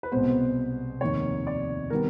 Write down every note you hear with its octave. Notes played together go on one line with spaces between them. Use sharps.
B4
C2 B2 G#3 B3 C5
F1 D#2 D#3 C#5
D5
D#3 G3 B3 A#4